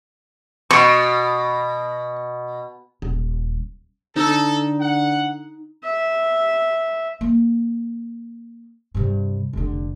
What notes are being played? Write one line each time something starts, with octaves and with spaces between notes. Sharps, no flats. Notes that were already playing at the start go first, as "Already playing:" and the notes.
B2 C#6
D#1
D3 D#4 A4
F#5
E5
A#3
G2 C3
F1 D3